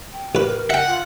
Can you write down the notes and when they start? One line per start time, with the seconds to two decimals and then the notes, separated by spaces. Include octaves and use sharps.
0.13 G5
0.35 A1 A#4 B4
0.70 E5 F#5 G5
0.87 F4